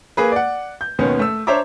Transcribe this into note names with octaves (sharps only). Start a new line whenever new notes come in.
A#3 G#4 B4
D5 F#5
G6
D#2 B2 D#3 B3 C#4
A3 E6
D4 C5 C#5 E5 A#5 D6